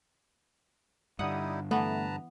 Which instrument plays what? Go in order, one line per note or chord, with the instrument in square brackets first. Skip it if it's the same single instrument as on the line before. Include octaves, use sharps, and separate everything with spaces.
[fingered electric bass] G2 D3 [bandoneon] G3 D#4 E4 [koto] F#5 [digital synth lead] D#6
[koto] E3 B3 [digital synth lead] A3 [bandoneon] B4 A5 A#5